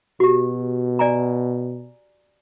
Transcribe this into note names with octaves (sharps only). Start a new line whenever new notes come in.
B2 F#4 G4
D5 G#5 A#5